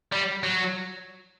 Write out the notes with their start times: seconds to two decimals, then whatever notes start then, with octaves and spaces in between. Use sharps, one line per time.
0.12 G3
0.44 F#3